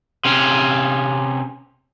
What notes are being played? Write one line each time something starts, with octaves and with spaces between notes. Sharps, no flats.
C3 C#4